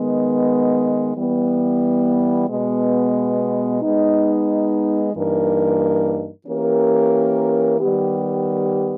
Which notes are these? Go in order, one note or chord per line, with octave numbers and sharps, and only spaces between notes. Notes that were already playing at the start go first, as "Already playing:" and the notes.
Already playing: D#3 G#3 B3
E3 G3 B3
B2 G#3 B3
G#3 B3 D#4
G2 E3 A#3 D#4 A#4
E3 A#3 C#4 G4 A#4
D#3 G3 B3 G4